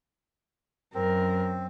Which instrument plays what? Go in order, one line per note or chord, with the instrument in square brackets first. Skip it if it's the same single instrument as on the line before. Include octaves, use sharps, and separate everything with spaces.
[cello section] F#2 [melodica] C4 [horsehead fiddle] A#4